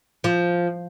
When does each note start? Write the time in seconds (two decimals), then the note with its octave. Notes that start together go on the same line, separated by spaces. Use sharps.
0.24 F3